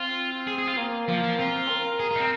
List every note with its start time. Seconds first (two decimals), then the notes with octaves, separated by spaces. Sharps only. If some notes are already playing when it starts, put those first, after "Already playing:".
Already playing: C4 F4
0.47 G#4
0.58 G#4
0.67 F4
0.77 A#3
1.08 F3 A#3
1.23 F3
1.38 C4 F4
1.69 A#4
1.99 G#4
2.11 F4
2.16 D#4
2.20 C4